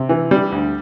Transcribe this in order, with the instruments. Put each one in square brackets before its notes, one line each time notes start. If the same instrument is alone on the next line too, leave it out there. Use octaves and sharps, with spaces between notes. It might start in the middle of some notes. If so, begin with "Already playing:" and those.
Already playing: [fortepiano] C3
E3
G3
D2